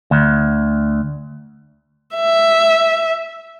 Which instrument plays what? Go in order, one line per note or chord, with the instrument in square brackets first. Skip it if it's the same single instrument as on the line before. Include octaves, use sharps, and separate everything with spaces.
[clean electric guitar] D2
[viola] E5